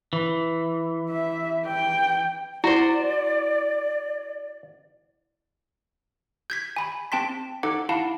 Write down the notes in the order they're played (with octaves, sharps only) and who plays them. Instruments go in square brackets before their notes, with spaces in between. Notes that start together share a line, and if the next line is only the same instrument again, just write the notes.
[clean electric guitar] E3
[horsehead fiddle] E5
G5
[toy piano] E4 [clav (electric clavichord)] F#4 C5 [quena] D5
[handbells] G6 G#6 B6
G#5 B5
C4 G5 A5 C6 B6
D#4 A4 F#5 D6
E4 F5 F#5 A5